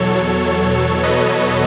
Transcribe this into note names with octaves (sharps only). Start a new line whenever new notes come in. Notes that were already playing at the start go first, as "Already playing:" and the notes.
Already playing: E2 B2 F#3 A4 C#5
B4 D#5